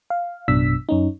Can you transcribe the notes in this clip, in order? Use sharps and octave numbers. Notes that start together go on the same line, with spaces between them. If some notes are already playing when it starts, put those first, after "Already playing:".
F5
A1 F#2 B2 D4 E6 B6
F#2 C#4 D#4